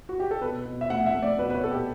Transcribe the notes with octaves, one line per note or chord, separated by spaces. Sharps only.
F#4
G4
A4
B2 B4
B2
E5
A3 F#5
E5
A3
D5
B2 B4
B4
C#5
B2 A4
G4